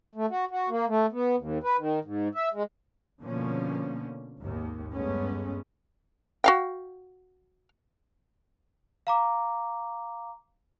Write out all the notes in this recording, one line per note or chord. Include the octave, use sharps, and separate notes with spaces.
A3
F#4
F#4
A#3
A3
B3
D#2
B4
D#3
G#2
E5
G#3
B2 D3 F3 A#3 C#4
G#1 D#2
G2 G#3 A3 B3 C#4
F#4 F5 G5
F5 A#5 D6